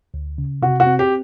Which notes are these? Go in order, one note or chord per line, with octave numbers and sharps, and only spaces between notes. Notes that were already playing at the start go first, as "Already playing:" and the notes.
D2
C#3
C3 F#4
F#4
C4
G4